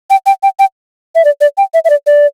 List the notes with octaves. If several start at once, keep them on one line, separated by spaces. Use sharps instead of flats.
G5
G5
G5
G5
E5
D5
D5
G5
E5
E5
D5
D5